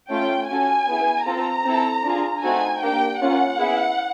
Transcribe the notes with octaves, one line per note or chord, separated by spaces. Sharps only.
A3 C#4 F4 G5
C#4 F#4 A4 G#5
B3 E4 G#4
C4 F4 A4 A#5
C4 E4 A4
D4 F4 G#4
A3 C4 D#4 F#4 A4 G#5
A#3 D4 G4 G5
A#3 C#4 F4 F#5
B3 E4 G#4